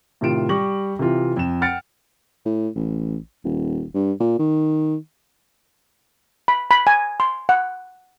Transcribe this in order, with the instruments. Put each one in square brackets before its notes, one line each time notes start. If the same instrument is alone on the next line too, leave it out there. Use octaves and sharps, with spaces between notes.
[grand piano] A2 C3 D#3 F4 D7 E7
G3 C#6 D6 A#6 F#7
C3 E3 F4
F2 E7
F#5 G5 F6 A6 C#7 D7
[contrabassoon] A2
A1
D#1
G2
A#2
D#3
[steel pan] B5
B5
G#5
C6
F#5